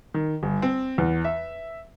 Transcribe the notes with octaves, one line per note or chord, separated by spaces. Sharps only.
D#3
G1
C4
E2
E5